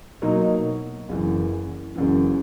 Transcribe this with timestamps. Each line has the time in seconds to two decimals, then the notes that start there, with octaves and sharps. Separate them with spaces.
0.22 B2 F#3 A#3 D#4
1.09 F#1 F#2 E3
1.96 F#1 F#2 E3